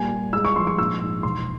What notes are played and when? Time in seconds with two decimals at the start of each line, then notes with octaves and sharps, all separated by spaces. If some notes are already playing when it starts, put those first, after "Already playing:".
Already playing: A#2 G3 G#5
0.10 G3
0.33 G#3 E6
0.45 C#6
0.56 F3 C6
0.67 C#6
0.78 A#1 E6
1.01 G#2
1.23 E1 C6